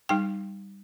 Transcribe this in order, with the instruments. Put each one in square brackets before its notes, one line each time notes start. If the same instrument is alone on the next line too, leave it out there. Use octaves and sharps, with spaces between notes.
[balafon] G3 D#4 G5